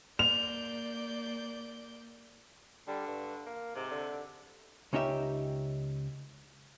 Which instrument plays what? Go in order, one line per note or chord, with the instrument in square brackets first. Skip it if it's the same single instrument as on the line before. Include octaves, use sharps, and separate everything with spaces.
[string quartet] A#3 D5 G6 [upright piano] F7
[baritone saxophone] D3 [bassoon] G3
[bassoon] G2
A#3
[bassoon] G#2 [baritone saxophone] C3
[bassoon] D3
[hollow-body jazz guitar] C#2 C#4 D#4 G4 E5